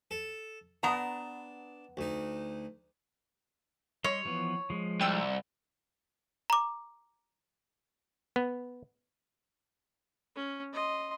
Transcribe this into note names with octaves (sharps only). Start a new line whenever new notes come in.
A4
B3 D4 A#5
D2 D#4
G3 C#5 D#5 C6
E3 F3 B3
F3 G#3
C2 G5 E6
A#5 D6
B3
C#4
D#5 C6